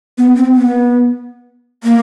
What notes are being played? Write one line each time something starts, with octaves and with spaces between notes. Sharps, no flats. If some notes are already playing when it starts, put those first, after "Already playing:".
B3
C4
B3
A#3